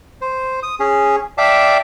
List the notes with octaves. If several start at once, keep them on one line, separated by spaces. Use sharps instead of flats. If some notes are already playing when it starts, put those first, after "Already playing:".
C5
D#6
C#4 G#4
D5 E5 F5 G5 A5 D6